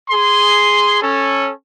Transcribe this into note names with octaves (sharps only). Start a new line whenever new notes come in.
G#4 C6
C#4 A4